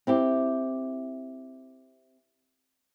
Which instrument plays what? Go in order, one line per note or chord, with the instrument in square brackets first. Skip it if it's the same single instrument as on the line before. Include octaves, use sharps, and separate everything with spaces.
[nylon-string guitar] C4 E4 G4